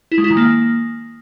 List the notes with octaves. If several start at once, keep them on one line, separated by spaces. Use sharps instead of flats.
E4
G#3
E4
D#3
A#3